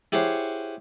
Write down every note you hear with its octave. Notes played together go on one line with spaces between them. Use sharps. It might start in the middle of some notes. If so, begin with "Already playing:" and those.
E4 G4 G#4 C5 C#5 F#5